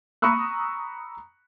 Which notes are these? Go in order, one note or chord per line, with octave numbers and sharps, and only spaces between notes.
A#5 B5 C#6 D#6 E6 F#6